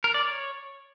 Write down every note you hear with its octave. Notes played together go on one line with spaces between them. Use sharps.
A#4
D5
C#5